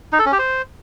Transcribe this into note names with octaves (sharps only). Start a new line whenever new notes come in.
D#4
A4
C#4
G4
C5